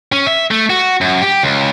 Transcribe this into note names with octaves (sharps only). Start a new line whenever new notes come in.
C#4
E5
A3
F#4
F#2
G4
C#2